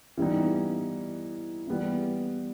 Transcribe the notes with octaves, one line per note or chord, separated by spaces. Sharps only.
E3 G3 B3 D#4
E3 G3 B3